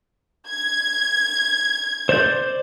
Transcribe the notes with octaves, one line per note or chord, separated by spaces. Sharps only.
G#6
C5 D5 G6